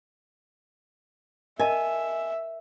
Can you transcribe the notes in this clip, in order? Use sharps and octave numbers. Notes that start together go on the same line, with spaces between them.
A#4 D#5 E5 G#5 A5